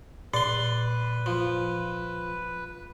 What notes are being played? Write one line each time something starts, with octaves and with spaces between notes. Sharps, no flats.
A#2 B4 D5 C6
F3